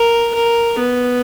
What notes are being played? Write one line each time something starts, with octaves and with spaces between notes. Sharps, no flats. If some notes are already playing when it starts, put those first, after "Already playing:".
Already playing: A#4
A#4
B3